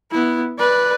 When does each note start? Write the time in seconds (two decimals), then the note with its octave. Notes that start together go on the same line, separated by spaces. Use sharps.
0.11 B3 E4
0.59 B4 D5